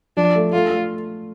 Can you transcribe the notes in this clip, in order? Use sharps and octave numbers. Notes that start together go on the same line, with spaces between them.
F3 D4
A3
A3 F4
A3